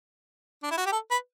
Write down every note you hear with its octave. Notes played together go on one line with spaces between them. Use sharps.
D4
E4
F#4
G4
A4
B4